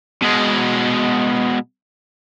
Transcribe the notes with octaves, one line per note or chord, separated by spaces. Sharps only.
B2 G#3